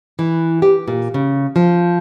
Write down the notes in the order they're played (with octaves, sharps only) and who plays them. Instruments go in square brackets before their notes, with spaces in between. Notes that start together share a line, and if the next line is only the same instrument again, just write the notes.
[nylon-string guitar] E3
G4
A#2
C#3
F3